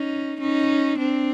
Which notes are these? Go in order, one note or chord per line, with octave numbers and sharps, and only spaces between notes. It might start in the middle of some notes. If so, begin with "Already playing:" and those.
Already playing: C#4 D#4
C#4 D#4
C4 D4